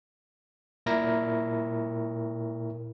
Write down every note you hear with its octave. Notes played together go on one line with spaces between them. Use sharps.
A#2 E4 A#4 A#6